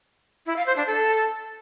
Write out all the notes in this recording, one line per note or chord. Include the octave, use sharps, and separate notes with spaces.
E4
F5
C5
D4
A4